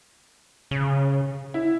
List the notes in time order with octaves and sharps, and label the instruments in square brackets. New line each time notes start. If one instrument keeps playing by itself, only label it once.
[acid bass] C#3
[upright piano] E4